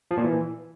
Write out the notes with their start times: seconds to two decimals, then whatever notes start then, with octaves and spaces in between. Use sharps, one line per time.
0.11 F3
0.17 A#2
0.24 E3